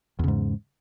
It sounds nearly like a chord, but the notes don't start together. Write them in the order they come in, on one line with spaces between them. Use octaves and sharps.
E2 C#3 G#2